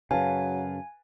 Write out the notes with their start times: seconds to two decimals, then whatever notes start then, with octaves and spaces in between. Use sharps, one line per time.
0.11 F#2 C#3 F#3 B4 F5 G#5 A5